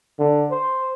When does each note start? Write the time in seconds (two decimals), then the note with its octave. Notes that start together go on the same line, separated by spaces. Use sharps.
0.19 D3
0.51 C5